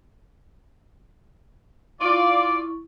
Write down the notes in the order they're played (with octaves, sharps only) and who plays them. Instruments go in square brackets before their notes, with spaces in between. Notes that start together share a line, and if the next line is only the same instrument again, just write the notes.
[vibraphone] E4 C#6 [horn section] F4 D5